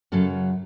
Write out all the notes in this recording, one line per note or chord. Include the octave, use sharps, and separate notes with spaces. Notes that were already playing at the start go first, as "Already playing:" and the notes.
F#2 C#3 F#3 A4